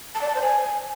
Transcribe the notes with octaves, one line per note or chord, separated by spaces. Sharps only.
A5
D5
A5
C5
G#5